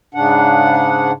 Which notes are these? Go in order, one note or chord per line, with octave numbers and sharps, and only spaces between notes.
G#2 C#3 D4 F#5